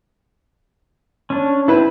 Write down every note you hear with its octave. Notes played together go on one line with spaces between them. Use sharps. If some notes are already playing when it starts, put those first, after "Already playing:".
C#4 D4
C4 D4 E4 B4